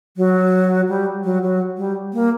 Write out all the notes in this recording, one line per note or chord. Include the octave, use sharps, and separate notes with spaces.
F#3
G3
F#3
F#3
G3
A#3